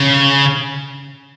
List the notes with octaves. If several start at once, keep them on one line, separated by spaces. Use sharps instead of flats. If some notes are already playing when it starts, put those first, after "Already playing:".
Already playing: C#3